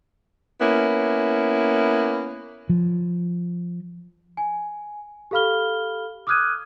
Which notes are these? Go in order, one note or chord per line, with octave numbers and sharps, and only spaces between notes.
A#3 B3 C#4 E4
F3
G#5
G4 A4 F5 B5 F6 G7
D6 D#6 F6 F#6 G#6 D#7